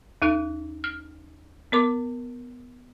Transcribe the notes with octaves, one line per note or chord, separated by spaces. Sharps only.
D#2 D#4 F#6
F6
B3 A#4 D6